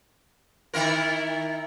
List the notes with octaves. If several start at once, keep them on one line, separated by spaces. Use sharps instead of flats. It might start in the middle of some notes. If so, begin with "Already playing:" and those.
D#3 E4 A#4